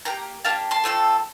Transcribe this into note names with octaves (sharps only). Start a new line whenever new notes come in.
A#3 D4 G4 G5 A#5
A#3 D4 G4 F5 A5
A5 C6
A3 C4 F4 A4